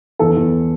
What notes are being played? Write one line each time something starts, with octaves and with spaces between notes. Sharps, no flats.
E2 A4
E2